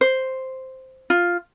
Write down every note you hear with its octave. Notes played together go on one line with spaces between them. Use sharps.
C5
F4